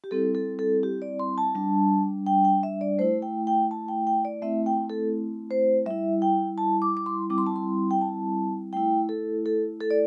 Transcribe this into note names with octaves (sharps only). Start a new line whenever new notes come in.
G4
G3 C4 E4 A4
A4
A4
G4
D5
C6
A5
G3 D4
G5
G5
E5
D5
A3 E4 C5
G5
G5
A5
G5
G5
D5
A3 C4 E4 E5
G5
A4
C5
G3 E4 E5
G5
A5
D6
D6
C6
G3 C4 E4 D6
C6
A5
C6
G5
A5
A3 E4 G5
A4
A4
A4
D5